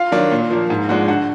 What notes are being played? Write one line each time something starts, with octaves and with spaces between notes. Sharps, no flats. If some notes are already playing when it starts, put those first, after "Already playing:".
Already playing: F4 F5
D#3 F#3 D4
A#2
F3 A#3
G#2
F3 G#3 D4 F#4 F#5
D3 F#4 F#5